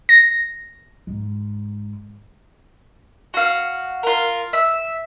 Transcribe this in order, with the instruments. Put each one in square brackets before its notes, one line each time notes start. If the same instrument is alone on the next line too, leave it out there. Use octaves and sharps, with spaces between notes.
[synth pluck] A#6
[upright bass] G#2
[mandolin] F#4 F5
F4 A#4
E5